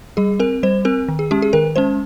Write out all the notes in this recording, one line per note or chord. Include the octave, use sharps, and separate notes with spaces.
G3 G#4
C4 A#4
G3 C5
C4 A#4
D#3
G#4
G#3 C#4 G4
G#4
D#3 A#4
G#3 C#4 C5